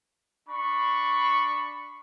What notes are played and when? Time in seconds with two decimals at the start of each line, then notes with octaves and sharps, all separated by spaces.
0.49 D4 B5 C#6